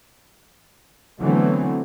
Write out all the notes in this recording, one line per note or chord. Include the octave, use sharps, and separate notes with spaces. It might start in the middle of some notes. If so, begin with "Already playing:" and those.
D3 E3 F#3 A3 B3 C4